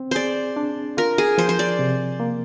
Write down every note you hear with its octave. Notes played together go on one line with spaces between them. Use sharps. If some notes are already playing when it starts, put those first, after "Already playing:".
Already playing: C4
G#4 C5 D5
D4
F4 A#4
G#4
F3 C5
C5
D5
C3
A#3